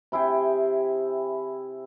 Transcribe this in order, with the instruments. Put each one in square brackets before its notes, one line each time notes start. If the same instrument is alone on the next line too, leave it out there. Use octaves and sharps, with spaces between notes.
[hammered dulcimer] C3 E4 G#4 G5